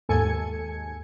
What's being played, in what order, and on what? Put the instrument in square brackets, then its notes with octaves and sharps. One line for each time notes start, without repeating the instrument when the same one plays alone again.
[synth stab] D#2 G#2 A4 G#5 G#6 C#7